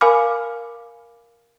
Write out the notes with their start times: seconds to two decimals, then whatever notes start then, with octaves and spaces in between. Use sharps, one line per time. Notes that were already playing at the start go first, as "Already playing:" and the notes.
0.01 A#4 F5 G#5 B5 D6 F6